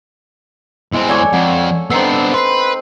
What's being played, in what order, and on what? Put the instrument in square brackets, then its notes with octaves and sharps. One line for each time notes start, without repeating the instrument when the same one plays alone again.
[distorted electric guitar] E2 C4 [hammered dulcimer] G#3
[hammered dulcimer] A4 C#5 G#5 [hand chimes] D5 D6
[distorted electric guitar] F2 [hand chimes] D5 F#5
[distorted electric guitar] B3 D4 [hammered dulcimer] C4 D#4 A4 [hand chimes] E6 C7
[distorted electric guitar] B4 [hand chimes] C6 C7